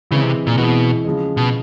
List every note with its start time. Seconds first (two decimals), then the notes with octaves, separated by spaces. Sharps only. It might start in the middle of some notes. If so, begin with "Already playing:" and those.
0.11 C#3 E3 G#3 C4 E4
0.23 C3
0.47 A#2
0.58 B2 E3 G#3 C4 E4
1.05 C#3 F3 G#3
1.37 B2